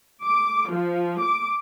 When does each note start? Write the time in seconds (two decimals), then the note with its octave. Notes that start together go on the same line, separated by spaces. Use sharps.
0.24 D6
0.71 F3
1.23 D6